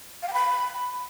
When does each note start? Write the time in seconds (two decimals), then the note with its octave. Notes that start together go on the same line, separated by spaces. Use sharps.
0.22 F5
0.28 G5
0.33 B5